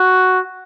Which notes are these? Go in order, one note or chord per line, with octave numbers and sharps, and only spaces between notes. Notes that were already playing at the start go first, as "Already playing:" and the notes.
Already playing: F#4